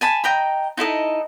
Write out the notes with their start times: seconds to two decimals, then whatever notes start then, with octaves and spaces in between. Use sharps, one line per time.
0.01 G#5 A5 B5
0.24 D#5 G5 A#5 B5
0.77 D#4 E4 A4 D#5